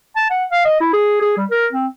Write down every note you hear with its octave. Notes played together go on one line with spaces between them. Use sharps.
A5
F#5
F5
D#5
E4
G#4
G#4
G3
A#4
C4